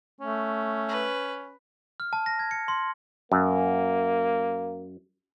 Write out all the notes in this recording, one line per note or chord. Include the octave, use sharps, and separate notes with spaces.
A3 C#4
B4
F6
A5
A#6
G#6
C#7
C6
F#2 A#3